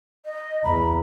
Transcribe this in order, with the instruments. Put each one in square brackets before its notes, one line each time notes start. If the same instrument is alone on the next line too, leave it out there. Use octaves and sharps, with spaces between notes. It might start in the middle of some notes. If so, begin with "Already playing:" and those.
[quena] D#5
[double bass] E2 [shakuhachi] A#5 [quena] B5